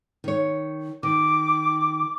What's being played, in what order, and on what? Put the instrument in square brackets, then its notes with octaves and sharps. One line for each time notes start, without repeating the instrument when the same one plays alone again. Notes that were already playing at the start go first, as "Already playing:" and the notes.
[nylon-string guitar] D#3 C#5
[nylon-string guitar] D#3 [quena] D6